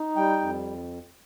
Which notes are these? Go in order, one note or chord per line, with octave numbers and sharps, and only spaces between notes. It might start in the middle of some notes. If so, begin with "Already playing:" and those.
Already playing: D#4
G3 G5
F2